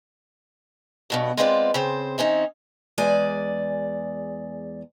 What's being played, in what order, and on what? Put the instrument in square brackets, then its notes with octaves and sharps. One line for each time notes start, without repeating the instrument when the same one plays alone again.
[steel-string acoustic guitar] G2 B2 F#3
G#3 B3 C4 F4 B4 D5
C#3 C4 C5
E3 C4 C#4 D#4
E2 G#3 D5 G#5